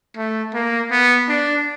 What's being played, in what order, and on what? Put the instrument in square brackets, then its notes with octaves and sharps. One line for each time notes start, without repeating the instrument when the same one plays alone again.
[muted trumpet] A3
A#3
B3
D4